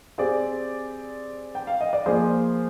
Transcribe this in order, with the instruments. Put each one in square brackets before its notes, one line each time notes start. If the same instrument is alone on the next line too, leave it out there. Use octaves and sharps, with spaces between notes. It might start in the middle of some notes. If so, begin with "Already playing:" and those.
[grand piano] C4 G4 D5 [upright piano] G#4 C5
[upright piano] G5
F5
D#5
D5
[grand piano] F3 A#3 F4 [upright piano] G#4 C5